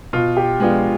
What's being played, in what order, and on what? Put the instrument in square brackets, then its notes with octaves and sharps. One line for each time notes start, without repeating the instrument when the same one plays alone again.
[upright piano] B2 [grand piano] F4
[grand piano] G4
[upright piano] G#3 B3 D4 F4